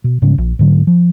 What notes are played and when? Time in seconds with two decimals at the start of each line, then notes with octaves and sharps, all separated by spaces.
0.04 B2
0.22 G#2 C#3 G3 C#4
0.38 A#1
0.59 G#2 D3 F#3
0.87 F3